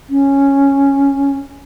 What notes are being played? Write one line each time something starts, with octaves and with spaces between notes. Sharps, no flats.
C#4